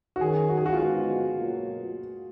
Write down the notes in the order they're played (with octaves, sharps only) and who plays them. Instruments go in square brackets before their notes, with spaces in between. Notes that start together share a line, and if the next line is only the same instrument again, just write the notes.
[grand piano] F#4
[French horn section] F#2 D#3 F#3 [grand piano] G#4
[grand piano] F#4
G#4
F#4
F4
[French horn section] D3 F3 G#3 B3 D#4 [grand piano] F#4
[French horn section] B2 F#3 A#3 F4